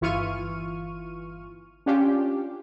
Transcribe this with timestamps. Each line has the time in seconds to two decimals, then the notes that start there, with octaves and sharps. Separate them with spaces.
0.01 G1 E3 F4 C#6 F6 D#7
1.86 C#4 D4 F4 G4